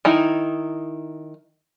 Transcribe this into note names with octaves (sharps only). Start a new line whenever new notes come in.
D#3 D#4 E4